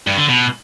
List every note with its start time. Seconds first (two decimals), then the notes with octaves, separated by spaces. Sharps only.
0.07 G2
0.18 D3
0.29 B2